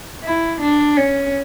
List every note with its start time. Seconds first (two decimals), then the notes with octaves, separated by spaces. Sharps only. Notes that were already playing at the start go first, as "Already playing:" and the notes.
0.24 E4
0.61 D4
0.97 C#4